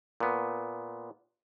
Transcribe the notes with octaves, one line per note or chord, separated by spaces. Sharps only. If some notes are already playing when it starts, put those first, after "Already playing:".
A#2 B3